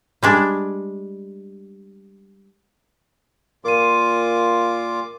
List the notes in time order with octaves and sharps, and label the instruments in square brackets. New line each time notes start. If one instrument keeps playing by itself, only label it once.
[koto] G3 G#3 D4
[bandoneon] A#2 F4 D6 [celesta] A#4 C6 D#7